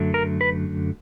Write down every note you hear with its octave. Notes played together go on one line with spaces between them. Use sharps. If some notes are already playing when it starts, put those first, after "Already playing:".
Already playing: F#2 D3 F#3 A3
A#4
B4